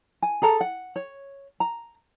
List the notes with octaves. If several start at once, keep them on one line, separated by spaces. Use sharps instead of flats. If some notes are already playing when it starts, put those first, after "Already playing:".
G#5
G#4 A4 A#5
F#5
C#5
A#5